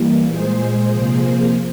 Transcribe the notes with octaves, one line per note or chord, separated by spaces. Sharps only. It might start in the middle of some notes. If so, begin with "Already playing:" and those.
Already playing: E3 G3 A#3
A#2 G#3 G#4 C5
C3 F3 A#3